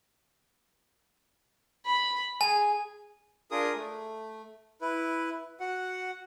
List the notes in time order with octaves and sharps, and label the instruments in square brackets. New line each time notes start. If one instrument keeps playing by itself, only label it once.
[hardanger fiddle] B5
[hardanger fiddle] G#4 [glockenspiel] G#5
[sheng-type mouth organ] D4 F4 G#4 A#4 D#6
A3
E4 B4
F#4 F#5